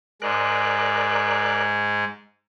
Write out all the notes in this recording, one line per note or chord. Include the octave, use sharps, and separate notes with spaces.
G#2 G#3 A#4 D5 F#6